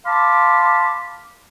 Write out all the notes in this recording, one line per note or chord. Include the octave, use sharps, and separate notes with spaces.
F5 A5 B5 C6 D6